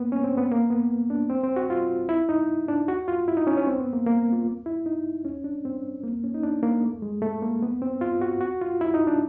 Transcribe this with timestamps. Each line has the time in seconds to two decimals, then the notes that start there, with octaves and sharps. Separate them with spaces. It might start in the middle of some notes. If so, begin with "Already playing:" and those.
Already playing: A#3 B3
0.12 C#4
0.24 C4
0.38 B3
0.52 A#3
0.70 B3
1.10 D4
1.30 C4
1.44 C4
1.56 F#4
1.70 F4
2.09 E4
2.29 D#4
2.68 D4
2.88 F#4
3.08 F4
3.28 E4
3.37 D#4
3.47 C#4
3.57 C#4
3.67 C4
3.80 B3
3.93 A#3
4.07 A#3
4.33 F4
4.66 E4
4.86 D#4
5.25 C#4
5.44 D4
5.65 C4
6.03 A#3
6.24 C#4
6.34 D#4
6.43 D4
6.63 A#3
6.84 A3
7.02 G#3
7.22 A3
7.42 A#3
7.62 B3
7.82 C4
8.01 F4
8.21 F#4
8.41 F#4
8.61 F4
8.81 E4
8.94 D#4
9.07 D4